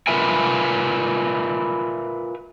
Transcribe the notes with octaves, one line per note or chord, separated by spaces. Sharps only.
F4 A#4 B4 E5 G#5